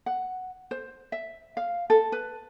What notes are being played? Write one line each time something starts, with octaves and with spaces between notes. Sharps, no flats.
F#5
C5
E5
F5
A4
B4